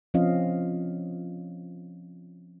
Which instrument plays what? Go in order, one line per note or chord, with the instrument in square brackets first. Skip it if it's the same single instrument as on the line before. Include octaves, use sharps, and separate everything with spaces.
[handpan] F3 C4 C#4 F4 D#5 F5